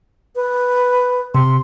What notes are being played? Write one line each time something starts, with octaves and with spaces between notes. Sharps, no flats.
B4
C3 C6